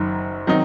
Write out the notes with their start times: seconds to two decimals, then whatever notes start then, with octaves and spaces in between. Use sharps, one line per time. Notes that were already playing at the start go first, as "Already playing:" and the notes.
Already playing: F#1 F#2 D#3
0.47 D#3 F#3 C4 D#4